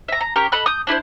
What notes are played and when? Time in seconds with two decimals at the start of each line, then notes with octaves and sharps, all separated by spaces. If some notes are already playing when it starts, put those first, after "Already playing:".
0.08 E5 A#5
0.21 A#5
0.36 C#4 G4 A#4
0.52 A4 D#5 B5 F#6
0.66 D#6 G6
0.87 D4 E4 G4 C5